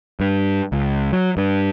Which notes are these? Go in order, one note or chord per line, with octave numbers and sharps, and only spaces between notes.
G2
C#2
F#3
G2